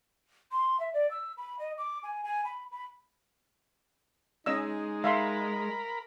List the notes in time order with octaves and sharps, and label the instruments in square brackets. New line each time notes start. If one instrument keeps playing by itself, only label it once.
[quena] C6
E5
D5
E6
B5
D#5
D6
G#5
G#5
B5
B5
[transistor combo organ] G#3 [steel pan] C#4 D#5 E6 [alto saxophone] D#4
[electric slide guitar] G#3 [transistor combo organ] A#4 B5 [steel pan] E5 F5 C6